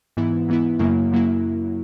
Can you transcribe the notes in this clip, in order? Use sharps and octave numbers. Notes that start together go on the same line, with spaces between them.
G#2 E3 B3 E4
G#2 E3 B3 E4
F#2 C#3 F#3 A#3 E4
F#2 C#3 F#3 A#3 E4